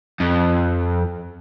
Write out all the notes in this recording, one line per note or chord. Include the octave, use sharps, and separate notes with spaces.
F2